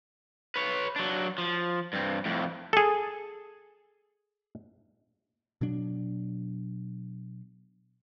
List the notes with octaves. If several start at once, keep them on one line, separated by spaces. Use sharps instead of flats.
B4 C#5
F#3 D4
F3
G2 C4
F2 A2
G#4 A4
B2 F#3 D4